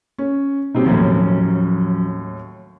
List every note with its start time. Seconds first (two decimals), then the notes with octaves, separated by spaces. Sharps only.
0.18 C#4
0.75 B2 F#3 G3 C4 D#4
0.86 D#2 A2 F3 F#3 C#4